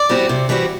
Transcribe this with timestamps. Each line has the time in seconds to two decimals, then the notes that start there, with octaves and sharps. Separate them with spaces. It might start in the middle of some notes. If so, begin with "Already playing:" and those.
Already playing: D5
0.09 E3 G3 C4 F#4
0.29 C3
0.49 E3 G3 C4 F#4